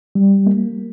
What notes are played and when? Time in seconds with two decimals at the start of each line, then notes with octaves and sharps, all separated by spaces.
0.15 G3
0.47 A#3